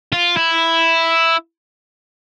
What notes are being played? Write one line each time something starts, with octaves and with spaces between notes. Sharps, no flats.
F4
E4